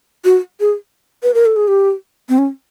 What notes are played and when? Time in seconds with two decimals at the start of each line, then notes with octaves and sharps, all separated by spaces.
0.25 F#4
0.60 G#4
1.23 B4
1.34 A#4
1.46 A4
1.56 G#4
1.68 G4
2.29 C4
2.38 C#4